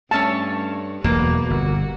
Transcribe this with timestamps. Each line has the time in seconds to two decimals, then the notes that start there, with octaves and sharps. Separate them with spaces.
0.11 G2 A3 C#4 C#5 A5
1.04 E1 E2 B2 F#3 A#3 B4
1.50 G1 F#4